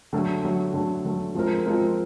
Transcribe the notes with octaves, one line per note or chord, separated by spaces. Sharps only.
D3 F#3 A3
D3 F#3 A3
D3 F#3 A3
D3 F#3 A3
F3 G#3 C4 F4 A#4
F3 G#3 C4 F4 A#4